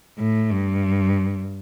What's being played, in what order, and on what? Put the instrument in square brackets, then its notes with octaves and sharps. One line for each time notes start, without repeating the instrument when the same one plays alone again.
[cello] A2
G2